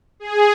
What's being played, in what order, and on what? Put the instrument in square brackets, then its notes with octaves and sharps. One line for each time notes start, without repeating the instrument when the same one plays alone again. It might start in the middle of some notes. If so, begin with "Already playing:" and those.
[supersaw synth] G#4